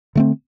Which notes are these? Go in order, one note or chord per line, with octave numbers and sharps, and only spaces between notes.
D3 A3 C4